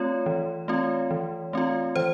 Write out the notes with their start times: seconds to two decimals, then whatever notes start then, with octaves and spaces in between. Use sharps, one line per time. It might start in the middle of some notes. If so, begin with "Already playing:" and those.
Already playing: A3 C4 F4 C#5
0.26 E3
0.68 A3 C4 F4
1.11 E3
1.53 A3 C4 F4
1.96 E3 C5